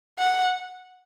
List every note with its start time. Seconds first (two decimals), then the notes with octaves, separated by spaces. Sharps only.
0.19 F#5